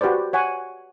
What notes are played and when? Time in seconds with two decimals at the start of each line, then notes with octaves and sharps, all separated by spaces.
0.01 F#4 G4 B4 C5 D5
0.33 C#5 F#5 G#5